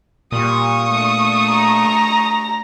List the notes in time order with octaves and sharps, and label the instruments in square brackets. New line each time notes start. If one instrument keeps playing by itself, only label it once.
[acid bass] A#2 [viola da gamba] G3 [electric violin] C#6 D#6
[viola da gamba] A3 D4
[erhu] A#5